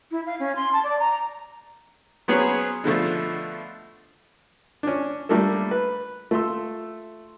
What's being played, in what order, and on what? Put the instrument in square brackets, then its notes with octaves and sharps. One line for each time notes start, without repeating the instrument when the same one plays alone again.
[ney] E4
F5
C#4
C6
A5
D5
A#5
[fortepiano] F#3 B3 C#4 G#4 C5 C#5
B2 D3 F3 A3
C#4 D4
G3 A3 A#3 D4 A4
B4
A3 F4 C6 E6